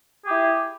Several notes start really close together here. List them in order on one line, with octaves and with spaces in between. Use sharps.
G#4 G4 E4